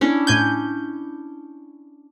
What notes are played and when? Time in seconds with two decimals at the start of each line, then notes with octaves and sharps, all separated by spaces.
0.01 C#4 D4 E4
0.27 A2 G#5 G6